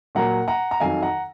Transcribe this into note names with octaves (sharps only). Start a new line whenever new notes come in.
A#2 F#3 A#3 F#5 A#5
F#5 A#5
A#5
F2 D#3 F#3 F5 G#5
F#5 A#5